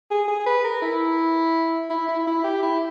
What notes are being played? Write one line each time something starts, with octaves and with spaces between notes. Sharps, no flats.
G#4
G#4
B4
A#4
E4
E4
E4
E4
G4
E4